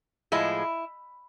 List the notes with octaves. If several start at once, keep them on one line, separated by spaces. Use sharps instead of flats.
A2 F3 G#3 E4